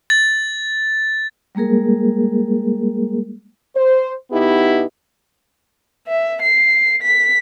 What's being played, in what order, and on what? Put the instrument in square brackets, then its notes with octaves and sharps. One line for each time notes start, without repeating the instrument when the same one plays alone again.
[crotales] A6
[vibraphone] G3 G#3 A#3 G#4 A#4
[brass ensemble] C5
B2 B3 D#4 E4 G4
[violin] E5
C7
B6